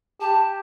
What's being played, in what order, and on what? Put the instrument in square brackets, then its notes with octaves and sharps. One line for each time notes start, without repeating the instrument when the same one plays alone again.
[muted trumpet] G4 [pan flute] A5